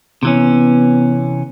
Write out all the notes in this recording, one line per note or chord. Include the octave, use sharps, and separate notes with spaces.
C3 E3 B3 C#4